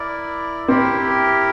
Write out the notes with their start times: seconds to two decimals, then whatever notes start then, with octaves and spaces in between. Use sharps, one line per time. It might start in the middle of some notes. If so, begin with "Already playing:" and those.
Already playing: E4 A#4 D5
0.68 C4 E4 G4 A#4